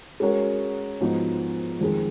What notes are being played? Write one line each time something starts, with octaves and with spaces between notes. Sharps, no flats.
G#3 C#4 F#4 A#4 C#5
G#2 F3 B3 D#4 F#4
F2 D#3 G#3